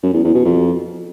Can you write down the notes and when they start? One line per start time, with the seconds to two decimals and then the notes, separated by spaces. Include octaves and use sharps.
0.03 F#2
0.14 E2
0.24 E2
0.34 B2
0.45 F2